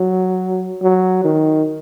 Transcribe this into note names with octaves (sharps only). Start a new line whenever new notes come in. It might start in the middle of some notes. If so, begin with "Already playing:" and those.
Already playing: F#3
F#3
D#3